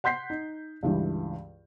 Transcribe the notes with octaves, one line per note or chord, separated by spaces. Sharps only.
F#5 C6 G6 B6 C7
D#4
C#2 G2 E3